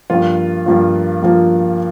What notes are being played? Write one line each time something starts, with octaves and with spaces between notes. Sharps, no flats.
G2 F3 A#3 F4
G2 F3 A#3 F4
G2 F3 A#3 F4